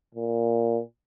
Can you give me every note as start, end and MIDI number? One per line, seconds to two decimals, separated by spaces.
0.15 0.81 46